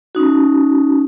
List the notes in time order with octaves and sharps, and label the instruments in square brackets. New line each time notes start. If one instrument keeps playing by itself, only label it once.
[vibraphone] C#4 D#4 F#4